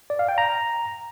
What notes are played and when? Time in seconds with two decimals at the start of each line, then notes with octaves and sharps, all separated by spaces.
0.10 D5
0.19 F5
0.29 G5
0.38 A#5